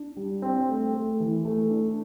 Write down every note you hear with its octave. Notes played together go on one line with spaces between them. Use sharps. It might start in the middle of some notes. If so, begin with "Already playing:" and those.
Already playing: D4
G3
C4
A3
A3
E3
A3
D4